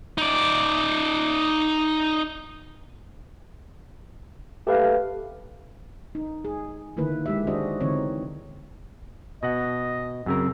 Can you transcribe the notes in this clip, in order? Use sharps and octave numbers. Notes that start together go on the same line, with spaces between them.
D#4 D5
A3 G4 B4 F5
D#4
G#4
D3 D#3 A#3 E4 B4
G#3 G4 E5
D#3 D4 F#4 G#4 C5 D#5
D3 E3 C4 D#4 C#5
B2 D#5 F#5
F#2 C#3 C4 A#4